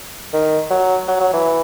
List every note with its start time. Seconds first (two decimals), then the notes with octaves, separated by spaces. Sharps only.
0.33 D#3
0.71 F#3
1.08 F#3
1.20 F#3
1.33 E3